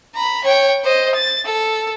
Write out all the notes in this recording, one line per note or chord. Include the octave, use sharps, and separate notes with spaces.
A#5 B5
C#5 G5
C5 D#5
A6
A4